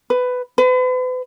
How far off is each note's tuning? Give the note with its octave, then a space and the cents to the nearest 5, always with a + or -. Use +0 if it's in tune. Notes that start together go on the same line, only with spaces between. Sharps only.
B4 +15
B4 +40